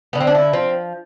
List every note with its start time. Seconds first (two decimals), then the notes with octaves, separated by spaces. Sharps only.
0.13 D3 B3
0.20 C4
0.27 D4
0.35 E4
0.53 F3 C4